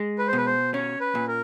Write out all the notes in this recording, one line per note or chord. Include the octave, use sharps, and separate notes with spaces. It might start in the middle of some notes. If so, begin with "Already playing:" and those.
Already playing: G#3
B4
C5
B2 B4
C5
C#4 C#5
B4
A#2
A#4